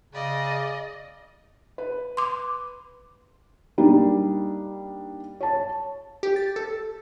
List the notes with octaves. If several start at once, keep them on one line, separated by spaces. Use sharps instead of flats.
C#3 D5 D#5
B4
C6 D6
G3 A#3 D4 D#4
C#5 A5
G4
A6
A4